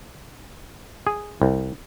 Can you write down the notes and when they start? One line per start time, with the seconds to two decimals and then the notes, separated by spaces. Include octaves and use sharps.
1.07 G#4
1.42 C2